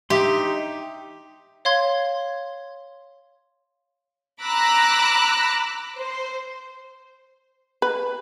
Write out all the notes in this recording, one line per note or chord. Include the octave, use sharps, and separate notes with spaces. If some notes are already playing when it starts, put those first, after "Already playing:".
D#4 G4 E5 C6
C#5 F5 C6 G#6
A#5 B5 D6 E6 F#6 A#6
C5
B4